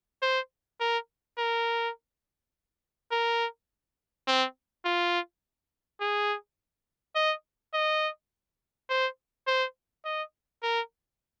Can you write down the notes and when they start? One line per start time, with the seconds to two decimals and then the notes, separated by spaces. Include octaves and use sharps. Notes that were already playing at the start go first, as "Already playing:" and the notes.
0.22 C5
0.81 A#4
1.38 A#4
3.11 A#4
4.28 C4
4.85 F4
6.01 G#4
7.16 D#5
7.74 D#5
8.90 C5
9.47 C5
10.05 D#5
10.63 A#4